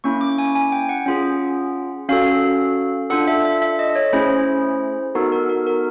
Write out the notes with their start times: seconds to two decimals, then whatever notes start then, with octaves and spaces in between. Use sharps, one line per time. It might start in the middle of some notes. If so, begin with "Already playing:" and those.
0.04 A#3 C#4 E4 C#6
0.21 D6
0.38 G#5
0.55 G#5
0.72 G5
0.89 F#5
1.06 C#4 F4 G#4
2.09 C#4 F#4 A4 F5
3.10 D4 F4 A4 F#5
3.28 E5
3.45 E5
3.62 E5
3.79 D#5
3.95 C#5
4.13 A3 C#4 E4 G#4 C5
5.15 B3 D#4 F#4 A4 A#4
5.32 A#4
5.49 A#4
5.67 A#4